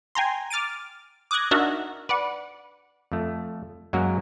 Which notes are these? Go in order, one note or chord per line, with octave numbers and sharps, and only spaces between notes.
G5 G#5 A#5 C6
D6 F6 A6 D7 D#7
D6 D#6 F#6 G#6 A#6
D4 D#4 F#4 A#4 E5 F#5
B4 D5 F#5
F2 A3
F#2 F#3 G#3 A#3 F#4 A#4